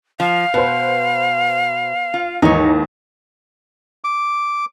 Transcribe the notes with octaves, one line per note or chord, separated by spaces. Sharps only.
F3 F5
B2 B4 C5
F4
D#2 G#2 E3 D#4 C#5
D6